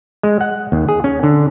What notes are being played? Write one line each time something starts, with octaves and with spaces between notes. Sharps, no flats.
G#3
F#5
D#2
G#4
C#4
D3